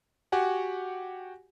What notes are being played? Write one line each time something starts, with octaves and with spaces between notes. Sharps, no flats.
F#4 G4 F#5 G#5